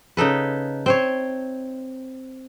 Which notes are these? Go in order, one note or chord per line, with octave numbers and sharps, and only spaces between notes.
C#3 D#4 A4 B4
C4 C5 C#5